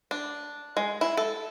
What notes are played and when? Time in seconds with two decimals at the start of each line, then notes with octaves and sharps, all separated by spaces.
0.11 D4
0.77 G#3
1.01 E4
1.17 A4